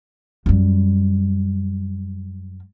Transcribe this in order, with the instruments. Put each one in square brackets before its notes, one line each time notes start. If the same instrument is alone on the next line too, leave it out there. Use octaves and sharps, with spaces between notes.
[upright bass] F#2 G3